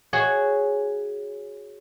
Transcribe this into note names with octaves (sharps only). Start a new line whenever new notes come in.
F#4 G#4 C#5